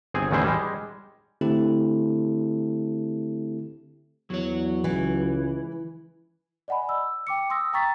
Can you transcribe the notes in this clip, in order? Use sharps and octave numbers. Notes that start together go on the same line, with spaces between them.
G1 C4 G#4
A1 E2 D#3 G#3 E4 C5
G3 G#3
D3 A3 C4 E4 G4 A4
E2 F#3 C#5
C#2 E3
D5 D#5 F#5 G#5 B5
E6
G5 D6 C#7
C6 D#6 E6 A#6
G5 A#5 C#6 A6 B6